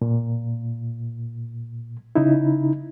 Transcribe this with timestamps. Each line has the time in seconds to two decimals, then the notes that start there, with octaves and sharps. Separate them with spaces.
0.02 A#2
2.15 C#3 D#4 E4